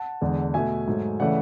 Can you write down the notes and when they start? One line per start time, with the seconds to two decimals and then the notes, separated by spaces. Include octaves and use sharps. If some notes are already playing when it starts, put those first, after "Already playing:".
Already playing: F#5 A5
0.21 E2 D3 G#3
0.54 B2 A3 E5 G#5
0.88 G#2 F#3 A3
1.20 C#3 E3 A3 D5 F#5